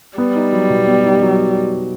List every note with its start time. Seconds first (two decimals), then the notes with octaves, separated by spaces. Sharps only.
0.18 G3 B3
0.35 D#4
0.53 F#3
0.70 B2
0.87 B3
1.05 D#4
1.22 F#3